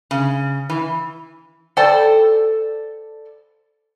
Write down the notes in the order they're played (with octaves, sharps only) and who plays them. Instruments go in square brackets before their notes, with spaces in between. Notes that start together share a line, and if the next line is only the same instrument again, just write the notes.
[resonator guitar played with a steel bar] C#3
E3
A4 C5 D5 G5 A5